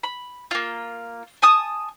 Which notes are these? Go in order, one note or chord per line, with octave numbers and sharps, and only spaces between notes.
B5
A#3 F4
G#5 A5 D#6